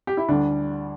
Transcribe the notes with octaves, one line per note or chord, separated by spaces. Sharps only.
G4
E4
D2 D3 G3 D4